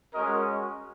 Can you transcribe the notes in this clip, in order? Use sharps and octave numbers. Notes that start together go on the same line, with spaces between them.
G#3 C#4 F#4 A#4 D#5